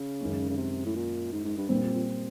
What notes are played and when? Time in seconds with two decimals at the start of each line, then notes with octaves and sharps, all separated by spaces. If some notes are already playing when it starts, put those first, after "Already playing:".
Already playing: C#3
0.21 F#2 D#3 G#3 C#4
0.50 C#3
0.57 C3
0.85 A2
0.95 A#2
1.32 G#2
1.44 G#2
1.57 G2
1.69 G2 A#2 G3 C4
1.82 F2
1.94 F2